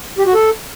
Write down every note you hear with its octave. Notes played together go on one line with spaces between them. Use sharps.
G4
F#4
A4